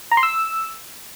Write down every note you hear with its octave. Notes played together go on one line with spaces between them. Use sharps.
A#5
C6
E6